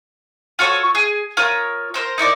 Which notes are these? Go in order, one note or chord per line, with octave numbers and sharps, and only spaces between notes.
F4 F#4 A4 C#5
G#4
F4 A#4 C#5 D#6
A#4 C5 A#5
D#4 E4 A#4 D5